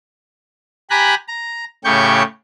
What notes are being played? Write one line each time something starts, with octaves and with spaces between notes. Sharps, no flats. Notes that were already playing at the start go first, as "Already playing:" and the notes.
G4 G#5 A#5 B5 F#6
A#5
A2 C#3 G4 C#6 G6